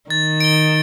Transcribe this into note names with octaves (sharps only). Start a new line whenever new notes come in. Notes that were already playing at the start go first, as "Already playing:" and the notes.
D#3 A6
D7 G7